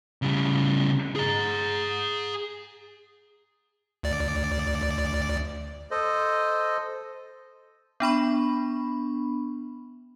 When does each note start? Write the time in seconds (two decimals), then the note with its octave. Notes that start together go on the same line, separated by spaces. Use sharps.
0.22 C#3 G3
1.16 G#4 A#5
4.03 D2 D5
5.91 A4 C5 D#5
8.00 B3 D4 B5 C#6